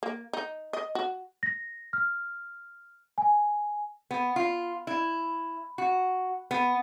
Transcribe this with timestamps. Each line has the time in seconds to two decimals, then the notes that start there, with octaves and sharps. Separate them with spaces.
0.03 A#3
0.33 D#4
0.73 D#5
0.95 F#4
1.43 A#6
1.93 F6
3.18 G#5
4.11 B3
4.36 F4
4.87 E4
5.78 F#4
6.51 B3